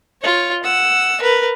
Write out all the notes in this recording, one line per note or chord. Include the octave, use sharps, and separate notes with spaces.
F4 C#5
F#5 E6
A#4 B4